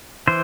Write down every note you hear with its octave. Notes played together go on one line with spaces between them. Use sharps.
E3 C5